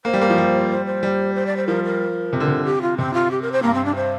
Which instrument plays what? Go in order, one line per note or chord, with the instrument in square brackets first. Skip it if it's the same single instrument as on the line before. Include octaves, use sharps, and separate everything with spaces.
[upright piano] A#3 [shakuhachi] C5
[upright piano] G3
A#3
F3
G3
[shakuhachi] C5
C5
[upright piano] G3
[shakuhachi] C5
D5
C5
[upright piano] F3 [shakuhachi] A#4
[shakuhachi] A#4
[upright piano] C3
D3
C3
[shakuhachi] G4
F4
[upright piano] C3 [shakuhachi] C4
[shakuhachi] F4
G4
A#4
C5
[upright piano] G2 [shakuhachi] A#3
[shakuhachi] C4
D4
C5